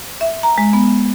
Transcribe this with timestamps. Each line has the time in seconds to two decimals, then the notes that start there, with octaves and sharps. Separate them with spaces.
0.21 E5
0.43 A#5
0.58 G#3
0.73 B3